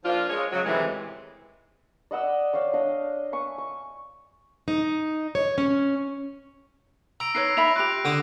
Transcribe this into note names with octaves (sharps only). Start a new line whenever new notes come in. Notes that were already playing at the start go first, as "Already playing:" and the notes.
F3 A#3 D4 F4
G#3 C#5
C#3 F#3
A2 C3 D#3 E3 G#3
D5 D#5 F#5 E6
C#5 D5 F5 G5
D4 D#5 F5
E5 G#5 C#6 D#6
C#6
D#4
C#5
C#4
A#5 E6 D7
D#4 B4 C#5 E6 A#6 C7
D#4 E5 B5 F7
F4 G4 F#6 D7 F7
D3 D6 D#6